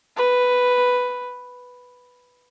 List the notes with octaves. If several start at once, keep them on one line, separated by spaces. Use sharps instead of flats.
B4